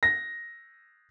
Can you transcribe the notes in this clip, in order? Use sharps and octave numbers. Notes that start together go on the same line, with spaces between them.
A#6